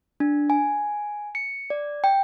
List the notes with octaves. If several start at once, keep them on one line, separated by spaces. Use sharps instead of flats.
D4
G#5
C#7
D5
G5